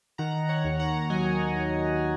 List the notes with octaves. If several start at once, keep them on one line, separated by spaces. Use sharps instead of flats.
D#3 F#5 A#5
C#5 F#5
D#2
F#5 A#5
F#3 D#5 G#5
D#2